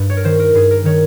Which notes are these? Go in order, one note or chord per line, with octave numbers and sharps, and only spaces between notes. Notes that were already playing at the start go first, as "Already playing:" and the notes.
Already playing: G2
C#5
A#4
D#3 C5
A#4
G2 G#4
A#4
D#3 C#5